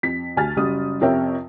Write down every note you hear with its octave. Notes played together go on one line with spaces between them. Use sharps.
F2 B6
D2 G#5 F6 A6
F#1 G3 F#4 D#6
F2 C3 A#4 C#5 E5 G5